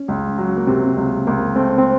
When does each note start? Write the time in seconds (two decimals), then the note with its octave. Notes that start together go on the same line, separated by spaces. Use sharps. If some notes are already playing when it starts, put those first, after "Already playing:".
Already playing: C#4
0.08 C#2
0.38 F#3
0.57 A#3
0.67 C3 C4
0.96 C#2
1.27 C#2 A#3
1.56 A3 C4
1.78 C4